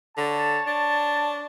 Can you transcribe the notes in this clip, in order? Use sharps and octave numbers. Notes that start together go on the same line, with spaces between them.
D3 C#5 A5
D4